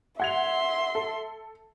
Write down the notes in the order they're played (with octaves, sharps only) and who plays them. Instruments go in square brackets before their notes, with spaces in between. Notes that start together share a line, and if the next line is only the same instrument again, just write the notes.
[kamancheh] E5 C6 [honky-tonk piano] F#5 G#6 F7
[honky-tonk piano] A4